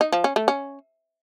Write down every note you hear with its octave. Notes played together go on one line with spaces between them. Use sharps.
D#4
F3
C#4
A3
C#4